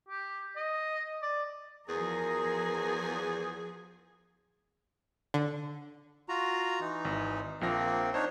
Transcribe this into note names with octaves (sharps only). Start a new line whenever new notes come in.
G4
D#5
D5
E2 F3 B3 F#4 G#4 A#4
D3
F4 F#4 A#5
E3 D#4
G#1
A#1 F3 A#3 C4 A#6
D4 D#4 C5 C#5